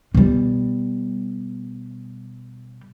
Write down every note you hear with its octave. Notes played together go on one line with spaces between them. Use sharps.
B2 G3